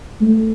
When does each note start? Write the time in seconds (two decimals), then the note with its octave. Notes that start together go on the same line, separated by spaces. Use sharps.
0.22 A3